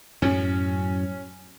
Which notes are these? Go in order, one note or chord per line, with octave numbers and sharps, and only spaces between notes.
F#2 A2 F#3 C#4